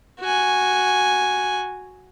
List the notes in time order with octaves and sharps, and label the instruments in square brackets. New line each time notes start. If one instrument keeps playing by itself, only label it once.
[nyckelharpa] F#4 G#5